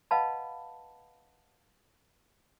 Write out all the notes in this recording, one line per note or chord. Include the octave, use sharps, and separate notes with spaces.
B4 D#5 F5 F#5 A5 B5